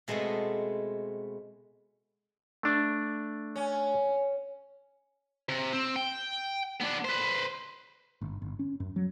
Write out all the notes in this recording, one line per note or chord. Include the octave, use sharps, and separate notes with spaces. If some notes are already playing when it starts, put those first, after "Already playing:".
B2 G#3 A3 B3 C4
A3 D4
C#4
C3
C4
G5
B3 D4
B4 C5
G1
G1
C#4
F#2
F#3